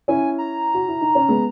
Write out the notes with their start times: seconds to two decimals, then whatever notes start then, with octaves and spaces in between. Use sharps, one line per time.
0.08 C#4 E4 G#5
0.38 A#5
0.74 F#4
0.88 E4
1.01 D#4
1.15 C#4
1.28 G#3 B3